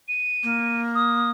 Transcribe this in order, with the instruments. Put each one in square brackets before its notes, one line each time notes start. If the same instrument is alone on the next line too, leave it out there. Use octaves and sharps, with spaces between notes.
[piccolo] D#7
[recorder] A#3
[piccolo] D#6